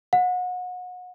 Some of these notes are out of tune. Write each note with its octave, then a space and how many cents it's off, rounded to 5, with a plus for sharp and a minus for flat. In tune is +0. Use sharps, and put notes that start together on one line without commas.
F#5 -30